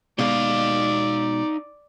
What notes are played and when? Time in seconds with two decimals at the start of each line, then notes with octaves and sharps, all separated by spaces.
0.19 B2 G#3 D#4 D5 F5